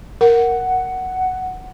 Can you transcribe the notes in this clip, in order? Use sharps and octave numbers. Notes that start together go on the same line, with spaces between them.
A#4 F#5